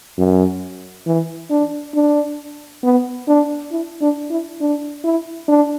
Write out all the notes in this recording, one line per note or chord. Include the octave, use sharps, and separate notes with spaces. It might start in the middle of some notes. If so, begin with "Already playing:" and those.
F#2
E3
D4
D4
B3
D4
E4
D4
E4
D4
E4
D4